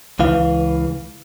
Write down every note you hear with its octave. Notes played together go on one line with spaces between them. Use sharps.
C#2 E3 F5